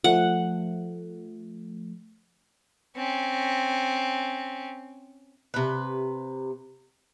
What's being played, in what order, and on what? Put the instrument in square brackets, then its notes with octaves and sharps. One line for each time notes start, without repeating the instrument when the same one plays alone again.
[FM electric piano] F3 A3 [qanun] F#5
[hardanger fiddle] C4 C#4
[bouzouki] C3 B4